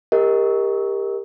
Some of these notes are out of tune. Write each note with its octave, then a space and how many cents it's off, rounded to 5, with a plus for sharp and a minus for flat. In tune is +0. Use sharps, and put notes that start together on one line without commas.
G4 +25 A#4 +0 D#5 +20